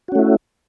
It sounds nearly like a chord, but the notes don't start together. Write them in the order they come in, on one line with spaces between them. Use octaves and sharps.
F#4 C#4 A3 E4